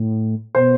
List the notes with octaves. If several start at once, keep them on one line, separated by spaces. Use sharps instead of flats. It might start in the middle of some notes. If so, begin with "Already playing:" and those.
Already playing: A2
B2 C5